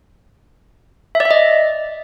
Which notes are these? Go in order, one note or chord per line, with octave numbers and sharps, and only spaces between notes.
E5
D5
E5
D#5